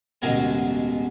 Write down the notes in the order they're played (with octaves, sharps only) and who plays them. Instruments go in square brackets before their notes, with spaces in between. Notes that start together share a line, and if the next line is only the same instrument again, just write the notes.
[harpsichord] A1 D2 B2 G#3 A#4 G#5